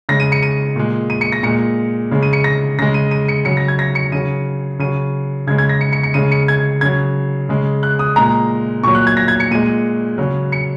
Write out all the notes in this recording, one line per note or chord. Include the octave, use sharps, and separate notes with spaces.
C#3 G#3 A#6
D#7
C#7
D#7
A#2 G#3
D#7
C#7
A#6
A#2 G#3 C#7
C#3 G#3
D#7
C#7
A#6
C#3 G#3 A#6
D#7
D#7
C#7
C#3 F#3 C#7
A#6
G#6
A#6
C#7
C#3 F#3 D#7
C#3 F#3 D#7
C#3 G#3 G#6
G#6
A#6
C#7
C#7
C#7
C#3 G#3 D#7
C#7
G#6
C#3 F#3 G#6
C#3 G#3
F#6
D#6
A#2 G#3 A#5
A#2 F#3 C#6
F#6
G#6
A#6
G#6
C#7
A#2 G#3 D#7
C#3 F#3
C#7